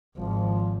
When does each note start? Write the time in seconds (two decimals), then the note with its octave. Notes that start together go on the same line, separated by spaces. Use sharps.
0.17 G#1 F3